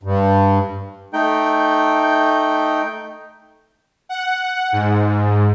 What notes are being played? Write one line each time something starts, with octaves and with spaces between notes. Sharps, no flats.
G2
A3 D#4 G5
F#5
G#2